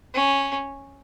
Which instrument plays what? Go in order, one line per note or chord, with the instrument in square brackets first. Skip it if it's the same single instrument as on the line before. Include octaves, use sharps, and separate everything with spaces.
[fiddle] C#4